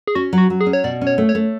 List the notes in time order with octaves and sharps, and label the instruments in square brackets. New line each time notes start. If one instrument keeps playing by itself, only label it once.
[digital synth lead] G#4
[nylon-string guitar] C#4 [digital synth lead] F#4
[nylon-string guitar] F#3
[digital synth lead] F#4
[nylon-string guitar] F#3
[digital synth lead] G#4
[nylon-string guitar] C#4
[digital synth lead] C#5
[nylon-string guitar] B2 [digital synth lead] D5
[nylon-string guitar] C#4
[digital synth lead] C#5
[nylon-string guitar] A3
[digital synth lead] C#5
[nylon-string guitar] A3